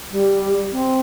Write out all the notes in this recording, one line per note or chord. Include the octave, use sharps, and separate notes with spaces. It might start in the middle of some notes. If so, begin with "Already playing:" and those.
G3
C4